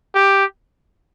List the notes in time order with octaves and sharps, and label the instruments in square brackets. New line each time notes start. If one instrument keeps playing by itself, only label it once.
[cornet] G4